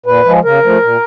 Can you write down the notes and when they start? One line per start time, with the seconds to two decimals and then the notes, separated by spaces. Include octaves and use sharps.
0.06 A#2 B4
0.25 F3 G#3
0.44 C#3 A#4
0.63 F3 A3
0.82 A#2